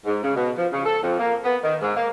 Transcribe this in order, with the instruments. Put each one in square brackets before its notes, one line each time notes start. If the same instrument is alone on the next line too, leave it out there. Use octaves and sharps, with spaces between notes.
[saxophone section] G#2
C#3
B2
F3
C#3
A4
F2
A#3
B3
D#3
G#2
A#3